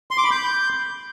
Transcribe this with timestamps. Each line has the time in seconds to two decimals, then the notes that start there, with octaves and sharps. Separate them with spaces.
0.11 C6
0.18 D6
0.24 B5
0.31 G6